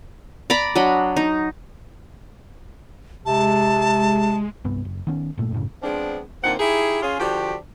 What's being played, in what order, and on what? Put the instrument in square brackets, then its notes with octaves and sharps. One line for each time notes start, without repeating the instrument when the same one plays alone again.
[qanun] D5 A#5 B5
F#3 D4 D#5 B5
D#4
[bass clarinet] C3 [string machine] G#3 [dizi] A5
[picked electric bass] C2 G2 B3
F#1
D#3 B3 C#4
G1 A#2 A3
F#2 A2 C#3
[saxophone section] F3 G#3 B3 C4 D4
A#2 D3 A#3 C4 D#4 F#5
D#4 E4 G4 G#4
C#4 F4 G#4
D3 F3 D4 F#4 G4